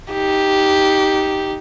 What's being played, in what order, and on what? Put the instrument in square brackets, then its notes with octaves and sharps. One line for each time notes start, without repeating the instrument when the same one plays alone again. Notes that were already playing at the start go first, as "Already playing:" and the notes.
[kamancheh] D#4 G4